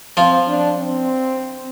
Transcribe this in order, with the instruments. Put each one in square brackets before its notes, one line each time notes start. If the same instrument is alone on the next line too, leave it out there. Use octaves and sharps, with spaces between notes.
[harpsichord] F3 F4 [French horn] C4
[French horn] D4
C4